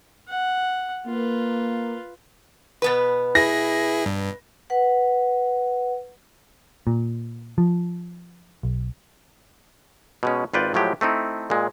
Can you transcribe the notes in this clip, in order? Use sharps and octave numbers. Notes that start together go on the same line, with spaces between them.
F#5
A#3 F4 B4
B2 B3 B4
E4 G#4 A#6
G2
B4 F#5
A#2
F3
B1
B2 G#3 C#4
G#1 F4 B4 D5 G5
A2 F3 F#3 G#3 G4
A3 C4 D#4 E4
A#2 G#3